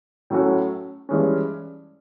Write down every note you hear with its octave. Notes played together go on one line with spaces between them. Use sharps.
A2 F#3 A3 C#4 F#4
G2 E3 G#3 C#4